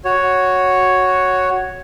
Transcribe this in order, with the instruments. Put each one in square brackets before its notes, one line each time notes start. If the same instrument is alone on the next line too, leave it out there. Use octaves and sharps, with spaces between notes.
[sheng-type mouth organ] F#4 C#5